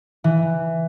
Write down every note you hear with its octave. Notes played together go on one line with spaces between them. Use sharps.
E3